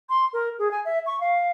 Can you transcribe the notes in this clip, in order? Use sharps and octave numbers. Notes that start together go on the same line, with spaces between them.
C6
A#4
G#4
G#5
E5
C#6
F5